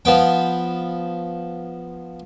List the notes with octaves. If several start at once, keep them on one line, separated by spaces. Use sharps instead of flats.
F3 B3 G5